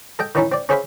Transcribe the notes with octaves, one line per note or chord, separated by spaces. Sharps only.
A4 D#5 G5
D#3 E3 C#4 D#4 E4
C4 D5
C#4 G#4 C5 E5 F5 B5